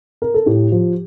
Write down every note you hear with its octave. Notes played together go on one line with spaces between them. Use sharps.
A#4
A4
A2 G4
F3